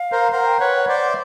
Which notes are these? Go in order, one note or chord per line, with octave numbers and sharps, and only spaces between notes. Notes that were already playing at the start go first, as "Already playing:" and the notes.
Already playing: F5
A#4 C5
A#4 C5 F#5
G5
B4 C#5 F#5
C5 D5
E5